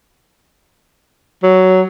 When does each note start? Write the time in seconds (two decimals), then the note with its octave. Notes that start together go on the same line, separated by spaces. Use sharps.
1.43 F#3